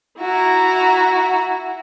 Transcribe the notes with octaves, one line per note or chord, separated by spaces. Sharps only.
E4 F#4 A#5